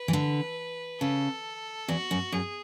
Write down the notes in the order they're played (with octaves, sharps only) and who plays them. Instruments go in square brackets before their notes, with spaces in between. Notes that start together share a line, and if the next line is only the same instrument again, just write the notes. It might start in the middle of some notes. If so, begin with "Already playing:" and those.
Already playing: [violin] B4
[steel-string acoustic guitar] E3
D3
[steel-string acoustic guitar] C#3 [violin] A4
[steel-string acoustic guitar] E2 [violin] F#4
[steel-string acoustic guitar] F#2
[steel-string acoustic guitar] F#2 [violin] G#4